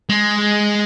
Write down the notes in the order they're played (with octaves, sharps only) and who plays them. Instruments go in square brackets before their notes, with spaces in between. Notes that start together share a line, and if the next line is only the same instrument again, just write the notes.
[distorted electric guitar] G#3